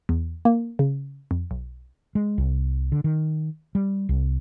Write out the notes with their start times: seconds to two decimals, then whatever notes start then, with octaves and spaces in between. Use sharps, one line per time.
0.09 E2
0.45 A#3
0.79 C#3
1.31 F2
1.51 B1
2.15 G#3
2.38 C2
2.92 D3
3.04 D#3
3.75 G3
4.09 C2